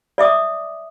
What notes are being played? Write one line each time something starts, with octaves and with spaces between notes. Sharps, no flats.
D5 E5 D6 D#6